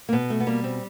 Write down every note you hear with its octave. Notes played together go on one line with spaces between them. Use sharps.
A#3
B2 B3
A3
B3
G3 A#3
C4